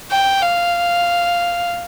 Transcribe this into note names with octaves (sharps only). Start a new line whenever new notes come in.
G5
F5